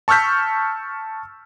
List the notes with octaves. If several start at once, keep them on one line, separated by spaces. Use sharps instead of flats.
A5 C#6 E6 F6 G6 B6